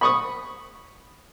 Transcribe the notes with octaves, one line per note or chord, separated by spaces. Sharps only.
B5 C#6 D#6